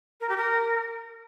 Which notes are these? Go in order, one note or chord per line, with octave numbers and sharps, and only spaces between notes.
A#4
G4
A#4